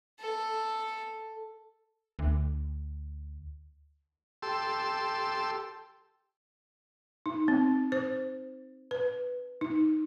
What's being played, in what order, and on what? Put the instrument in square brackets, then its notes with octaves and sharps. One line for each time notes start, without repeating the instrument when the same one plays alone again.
[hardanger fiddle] A4
[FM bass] D2
[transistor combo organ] G4 A4 C6 E6
[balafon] D#4
C4
C5
B4
D#4